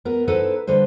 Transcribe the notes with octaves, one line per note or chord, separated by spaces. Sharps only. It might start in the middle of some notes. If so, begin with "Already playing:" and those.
B3 A#4
D#4 E4 A4 B4 C5
D3 G3 B4 C5